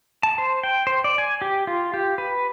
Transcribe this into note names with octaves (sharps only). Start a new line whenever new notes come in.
A5
C5
G5
C5
D5
G#5
G4
F4
G4
B4